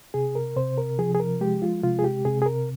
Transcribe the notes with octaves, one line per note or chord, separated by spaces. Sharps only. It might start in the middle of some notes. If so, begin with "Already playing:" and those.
C3 G#4
A#4
C3 C5
A#4
F3 G#4
G#4
A#4
G#3 G4
F4
C3 F4
G#4
G4
C3 G#4
G#4
A#4